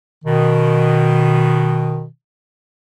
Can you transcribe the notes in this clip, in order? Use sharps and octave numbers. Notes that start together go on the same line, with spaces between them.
B2 D#3